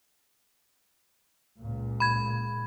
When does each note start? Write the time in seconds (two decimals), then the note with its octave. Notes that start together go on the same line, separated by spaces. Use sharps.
1.60 C#2 A#2
2.00 B5 G#6